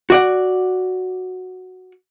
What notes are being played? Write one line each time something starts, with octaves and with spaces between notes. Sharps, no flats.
F#4 D5 F#5